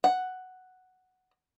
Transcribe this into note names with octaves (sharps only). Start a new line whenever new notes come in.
F#5